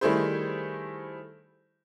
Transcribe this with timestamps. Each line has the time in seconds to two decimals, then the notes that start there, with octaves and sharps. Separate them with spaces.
0.01 D#3 G3 A3 E4 G#4 C5